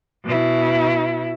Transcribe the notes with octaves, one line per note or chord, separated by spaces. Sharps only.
B2 E4